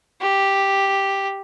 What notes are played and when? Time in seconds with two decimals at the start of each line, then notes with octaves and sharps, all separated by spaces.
0.21 G4